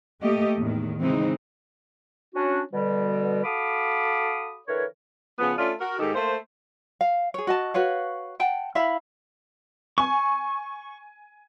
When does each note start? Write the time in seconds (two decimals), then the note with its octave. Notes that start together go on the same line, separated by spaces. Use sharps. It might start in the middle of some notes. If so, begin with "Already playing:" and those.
0.21 A3 A#3 G4 D#5
0.57 E2 A2 D#3
1.00 C#3 E3 G#3 C4 D#4
2.35 C#4 D4 F#4
2.72 B2 D3 G3
3.44 F#4 A4 F5 B5 D6 D#6
4.68 D3 E3 A#4 B4 C#5
5.39 C#3 F3 B3
5.57 A3 C#4 D4 F4
5.80 F#4 A#4
5.99 G#2 D#3 D#4 G4 A4
6.14 A3 A#3 C5
7.01 F5
7.34 G#4 C#5
7.47 F#4 D#5 A5
7.74 F#4 B4 C#5 F5
8.40 F#5 G5 A5
8.75 E4 E5 F5 B5
9.98 G#5 C#6